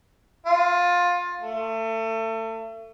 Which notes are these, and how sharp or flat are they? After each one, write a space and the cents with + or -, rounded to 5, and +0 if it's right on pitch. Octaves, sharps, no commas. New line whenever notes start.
F4 +20
A3 +30